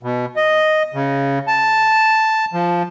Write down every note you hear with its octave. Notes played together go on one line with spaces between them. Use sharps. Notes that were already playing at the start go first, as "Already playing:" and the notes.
B2
D#5
C#3
A5
F3